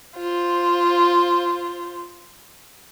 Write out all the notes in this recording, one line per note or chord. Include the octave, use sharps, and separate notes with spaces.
F4 C5